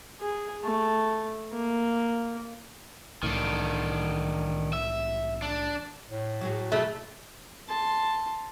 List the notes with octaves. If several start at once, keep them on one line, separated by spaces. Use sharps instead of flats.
G#4
A3
A#3
C2 A2 D#3 E3 D4
E5
D4
A2
F#3 F#4 G#4
D#2 B2 A3 E4 G#4
A5 C6